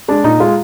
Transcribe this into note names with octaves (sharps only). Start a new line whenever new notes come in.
G#3 D4
A#2 D#4
G#3 F4